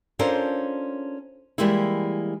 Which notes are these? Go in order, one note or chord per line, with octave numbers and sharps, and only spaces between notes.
C#4 D4 F4 A4 A#4 C5
E3 G3 G#3 A#3 E4